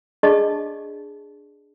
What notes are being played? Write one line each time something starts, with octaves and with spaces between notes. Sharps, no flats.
D4 G#4 D5 D#5 A5 C#6